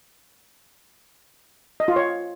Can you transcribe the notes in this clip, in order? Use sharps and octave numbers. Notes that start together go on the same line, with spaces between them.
D#5
F4
C#5